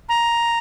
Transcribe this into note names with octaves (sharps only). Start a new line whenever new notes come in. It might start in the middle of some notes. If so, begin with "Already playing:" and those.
A#5